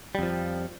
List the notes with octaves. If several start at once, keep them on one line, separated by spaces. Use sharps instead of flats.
F2 F3 G3